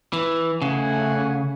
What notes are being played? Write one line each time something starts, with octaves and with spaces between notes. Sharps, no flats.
E3
C#3 A3 F#5 G#5